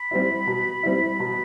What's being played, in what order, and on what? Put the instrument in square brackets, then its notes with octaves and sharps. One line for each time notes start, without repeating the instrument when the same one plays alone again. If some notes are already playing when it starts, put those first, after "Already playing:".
Already playing: [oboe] B5
[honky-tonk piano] G3 C4 E4
B2
G3 C4 E4
[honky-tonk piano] B2 [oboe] B5